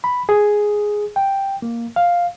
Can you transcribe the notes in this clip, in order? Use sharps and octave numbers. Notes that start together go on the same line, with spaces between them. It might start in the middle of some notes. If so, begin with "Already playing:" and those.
B5
G#4
G5
A#3
F5